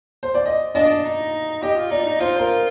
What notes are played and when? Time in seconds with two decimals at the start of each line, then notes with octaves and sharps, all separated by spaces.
0.23 C5
0.35 D5
0.46 D#5
0.75 D4 D#5
1.04 D#4
1.62 G4 D#5
1.76 F4
1.91 D#4 D5
2.06 D#4
2.20 F4 C5
2.36 C5
2.39 A#4